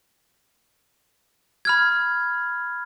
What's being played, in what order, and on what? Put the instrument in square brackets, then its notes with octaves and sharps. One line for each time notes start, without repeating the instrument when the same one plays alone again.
[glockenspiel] B5 F6 G#6